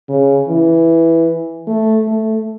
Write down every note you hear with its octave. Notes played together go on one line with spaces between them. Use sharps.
C#3
E3
A3
A3